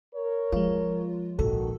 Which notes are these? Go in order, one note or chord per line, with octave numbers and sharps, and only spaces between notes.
A#4 C#5
F3 G#3 F4
A#1 G#2 D#3 F#4 A4